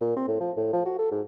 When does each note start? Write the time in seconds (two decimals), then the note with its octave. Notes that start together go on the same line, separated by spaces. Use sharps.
0.01 A#2
0.16 C4
0.28 A2
0.40 F3
0.57 A2
0.73 F3
0.86 F#4
0.99 A4
1.11 G#2